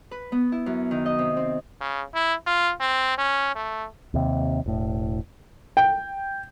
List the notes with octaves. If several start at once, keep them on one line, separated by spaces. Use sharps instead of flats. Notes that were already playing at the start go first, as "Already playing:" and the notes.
B4
B3
E4
F#2
D#3
D#5
C3
C4
C#3
E4
F4
C4
C#4
A3
D#2 C3
E1 A2
G5